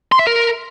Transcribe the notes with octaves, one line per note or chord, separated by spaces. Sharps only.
C6
E5
A#4